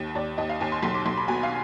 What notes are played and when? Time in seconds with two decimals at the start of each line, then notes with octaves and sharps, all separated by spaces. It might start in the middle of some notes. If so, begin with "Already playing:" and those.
Already playing: D#2
0.15 D#2 D5
0.38 D#2 D#5
0.49 F5
0.60 D#2 G#5
0.72 C6
0.83 B1 C6
0.95 D6
1.05 B1 C6
1.17 B5
1.28 B2 G#5
1.43 F5